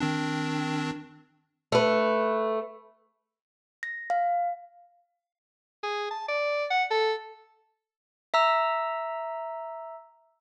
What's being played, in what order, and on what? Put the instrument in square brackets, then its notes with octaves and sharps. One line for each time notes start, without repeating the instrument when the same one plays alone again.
[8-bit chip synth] D#3 C4 D4
[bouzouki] A3 B4
[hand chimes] A#6
F5
[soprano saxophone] G#4
A5
D5
F#5
A4
[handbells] E5 A#5 E6